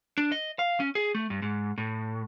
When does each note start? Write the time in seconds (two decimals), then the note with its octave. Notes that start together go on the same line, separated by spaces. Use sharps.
0.18 D4
0.32 D#5
0.59 F5
0.80 C#4
0.95 G#4
1.15 A3
1.30 G2
1.42 G#2
1.78 A2